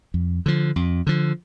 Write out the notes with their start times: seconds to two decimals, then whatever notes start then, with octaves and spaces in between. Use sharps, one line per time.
0.14 F2
0.46 D3 F3
0.76 F2
1.07 D3 F3